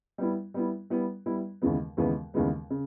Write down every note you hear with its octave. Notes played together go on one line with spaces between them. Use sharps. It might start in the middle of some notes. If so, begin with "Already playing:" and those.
G3 B3 E4
G3 B3 E4
G3 B3 E4
G3 B3 E4
D#2 C#3 E3 G#3 B3
D#2 C#3 E3 G#3 B3
D#2 C#3 E3 G#3 B3
C#3